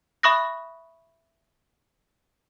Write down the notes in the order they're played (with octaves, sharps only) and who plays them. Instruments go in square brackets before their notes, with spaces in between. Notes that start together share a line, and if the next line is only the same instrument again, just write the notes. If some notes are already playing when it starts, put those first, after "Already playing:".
[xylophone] E5 B5 C#6 D#6 F#6 A#6